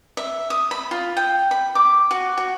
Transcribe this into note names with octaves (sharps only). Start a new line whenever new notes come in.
E5
D#6
B5
F4
G5
B5
D6
F#4
F#4